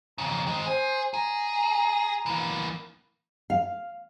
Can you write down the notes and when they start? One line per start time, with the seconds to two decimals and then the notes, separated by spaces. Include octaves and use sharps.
0.18 F2 C#3 A#5
0.47 G#3 C4
0.66 G#4 C5
1.14 G#4 A#5
2.26 E3 A#3
3.50 F5